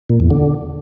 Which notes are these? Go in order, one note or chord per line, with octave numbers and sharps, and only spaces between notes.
A#2
E2
D3